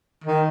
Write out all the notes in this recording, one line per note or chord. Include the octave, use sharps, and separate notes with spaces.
D#3